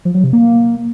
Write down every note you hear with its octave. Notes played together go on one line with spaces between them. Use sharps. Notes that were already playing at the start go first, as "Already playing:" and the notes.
F3
F#3
C3
A#3